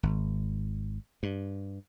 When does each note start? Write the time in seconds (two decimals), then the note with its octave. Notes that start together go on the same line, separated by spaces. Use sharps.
0.03 G#1
1.23 G2